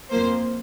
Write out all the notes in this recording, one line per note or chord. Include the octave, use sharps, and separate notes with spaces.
F2 F3 A#3 C5